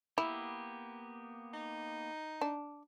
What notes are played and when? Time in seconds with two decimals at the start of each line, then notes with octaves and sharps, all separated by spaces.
0.18 A#3 B3 E4 G4
1.54 D#4
2.41 D4